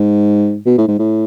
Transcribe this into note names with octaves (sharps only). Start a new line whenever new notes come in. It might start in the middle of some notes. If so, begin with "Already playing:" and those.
Already playing: G#2
B2
A2
G#2
A2